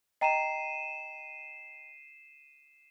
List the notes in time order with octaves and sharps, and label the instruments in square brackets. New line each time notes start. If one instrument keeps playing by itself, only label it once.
[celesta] D#5 G5 A#5 [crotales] C7 D#7 E7